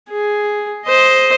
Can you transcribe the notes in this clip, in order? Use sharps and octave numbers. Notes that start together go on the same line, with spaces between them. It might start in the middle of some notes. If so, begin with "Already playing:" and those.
G#4
C5 D#5